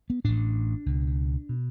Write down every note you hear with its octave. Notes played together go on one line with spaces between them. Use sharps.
B3
A1 A2 D4
C#2 B2
B2